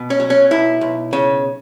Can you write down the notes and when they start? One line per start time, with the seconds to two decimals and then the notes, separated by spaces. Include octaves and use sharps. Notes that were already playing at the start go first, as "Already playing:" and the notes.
Already playing: B2
0.10 C#4
0.20 F#3
0.30 C#4
0.51 B1 E4
0.81 B1
1.13 C#3